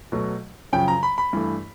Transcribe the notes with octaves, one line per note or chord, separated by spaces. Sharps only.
B2 F#3 A3
F#2 C#3 F3 G5
A#5
B5
B5
G2 E3 A3